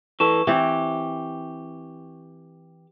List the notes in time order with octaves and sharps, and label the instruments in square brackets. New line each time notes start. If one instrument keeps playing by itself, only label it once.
[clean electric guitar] E3 A4 [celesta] C#6 E7
[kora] E3 C4 [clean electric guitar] G4